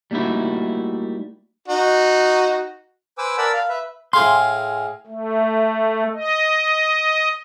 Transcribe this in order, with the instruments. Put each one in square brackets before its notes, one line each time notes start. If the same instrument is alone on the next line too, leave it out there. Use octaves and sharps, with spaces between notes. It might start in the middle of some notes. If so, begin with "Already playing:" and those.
[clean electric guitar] G3 A3 A#3 D#4 E4 F#4
[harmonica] D#4 F#4
[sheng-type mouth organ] B4 C5 G#5 D6 E6
A#4 D5 F#5 A5 B5 E6
F5
B4 E5
[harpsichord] A2 G#4 F5 [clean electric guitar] C6
[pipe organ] A3
D#5